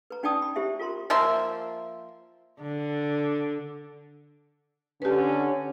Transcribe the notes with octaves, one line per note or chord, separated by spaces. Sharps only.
B4 A#5
C#4 D#4 D5 G5 A5 D#6
B5
E4 G4 C5 E5
F4 A#4 A#5 C6
F3 A#3 E5 C6
D3
D3 C#4 G4 B4